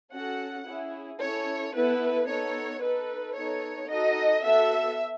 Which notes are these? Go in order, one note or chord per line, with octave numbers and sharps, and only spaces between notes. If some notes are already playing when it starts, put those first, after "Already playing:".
C#4 F#4 A4 F#5
C#4 E4 G#4
C#4 E4 A4 C#5
B3 E4 A4 B4
B3 D#4 A4 C#5
D#4 A4 B4
B3 D#4 A4 C#5
D#4 F#4 A4 D#5
B3 F#4 A4 E5